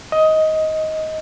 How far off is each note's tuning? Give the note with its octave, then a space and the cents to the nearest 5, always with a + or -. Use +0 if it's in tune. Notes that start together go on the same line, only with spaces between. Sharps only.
D#5 +15